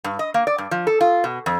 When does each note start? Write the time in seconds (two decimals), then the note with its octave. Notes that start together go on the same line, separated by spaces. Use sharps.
0.04 G2
0.19 D#5
0.34 A#3
0.47 D5
0.58 G2
0.71 F3
0.87 A4
1.01 F4
1.24 B2
1.46 F2